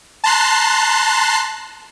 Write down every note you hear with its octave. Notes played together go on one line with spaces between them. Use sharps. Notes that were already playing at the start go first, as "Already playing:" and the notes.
A5 A#5 C6 F#6 C7